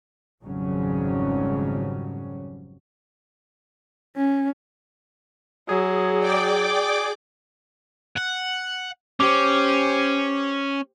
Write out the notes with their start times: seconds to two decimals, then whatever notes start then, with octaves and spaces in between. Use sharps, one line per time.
0.43 G#1 F2 C#3 F#3 G3 C#4
4.16 C#4
5.69 F#3 G#4
6.20 D5 G5 D6
8.17 F#5
9.20 C#4 G4 C5 D6